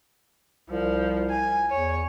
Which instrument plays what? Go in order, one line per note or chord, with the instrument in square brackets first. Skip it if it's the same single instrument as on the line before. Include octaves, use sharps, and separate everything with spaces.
[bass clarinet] C2 [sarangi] F3
[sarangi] G#5
[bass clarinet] E2 [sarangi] C#5